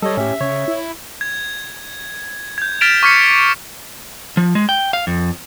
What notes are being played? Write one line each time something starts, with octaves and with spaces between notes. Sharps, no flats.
G3 A4 C#5 D#5
A2 C#4 G4 E5
C#3 C#5
E4
G#6
G6 G#6
F6 A6 B6 D7 E7 F7
C#6 D6 F6 G#6 B6 C#7
F3
G#3
G5
F5
F2